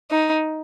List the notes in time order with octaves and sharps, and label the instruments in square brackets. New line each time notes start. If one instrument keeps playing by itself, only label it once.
[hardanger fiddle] D#4